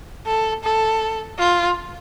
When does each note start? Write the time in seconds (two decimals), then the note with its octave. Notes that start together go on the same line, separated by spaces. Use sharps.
0.27 A4
0.64 A4
1.39 F4